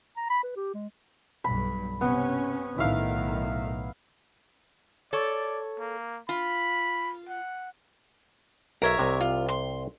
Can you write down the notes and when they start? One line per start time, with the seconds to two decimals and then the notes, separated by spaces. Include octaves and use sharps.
0.17 A#5
0.30 B5
0.44 B4
0.56 G4
0.74 G#3
1.44 B1 G2 B5
2.01 C3 B3 C#4
2.78 B1 A2 D#3 E4 F5
5.13 A4 C#5 D5
5.79 A#3
6.29 F4 B5
7.29 F#5
8.82 B1 A#4 C#5 E5
8.97 C2 C3 D#5
9.21 F4
9.49 C6